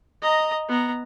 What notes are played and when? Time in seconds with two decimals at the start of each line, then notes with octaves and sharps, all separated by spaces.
0.21 D#5 A#5
0.68 B3 A#5